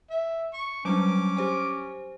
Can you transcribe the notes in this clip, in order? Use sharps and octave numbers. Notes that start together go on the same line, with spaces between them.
E5
C#6
F#3 G3 C#4 D4 D6
G4 C5 G#5